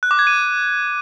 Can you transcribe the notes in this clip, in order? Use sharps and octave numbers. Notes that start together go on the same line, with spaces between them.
F#6
D6
G#6
D#7